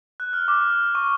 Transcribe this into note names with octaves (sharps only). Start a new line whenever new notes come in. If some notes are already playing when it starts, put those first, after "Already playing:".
F#6
F6
D6
F6
C#6